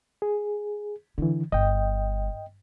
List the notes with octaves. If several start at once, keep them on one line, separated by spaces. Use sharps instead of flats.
G#4
D3 E3 E4
G1 D#5 G5